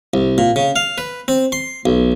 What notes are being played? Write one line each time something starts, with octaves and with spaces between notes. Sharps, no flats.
C2
A#2
C#3
F5
B4
C4
C6
B1